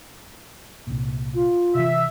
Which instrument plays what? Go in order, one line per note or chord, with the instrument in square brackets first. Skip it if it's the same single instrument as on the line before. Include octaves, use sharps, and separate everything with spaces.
[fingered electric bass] C2 A#2
[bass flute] F4
[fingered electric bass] C3 E3 [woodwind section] E5